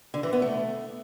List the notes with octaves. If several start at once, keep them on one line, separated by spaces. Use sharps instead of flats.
D3
E3
B3
A3